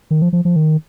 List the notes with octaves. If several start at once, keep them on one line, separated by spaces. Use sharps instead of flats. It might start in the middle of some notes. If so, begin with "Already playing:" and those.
D#3
F3
F3
F3
D#3